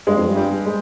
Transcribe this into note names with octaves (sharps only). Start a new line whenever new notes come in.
G2 G#3
F2
G2
G3
G#3